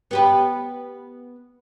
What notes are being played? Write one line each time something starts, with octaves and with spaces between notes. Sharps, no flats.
B3 G4 B4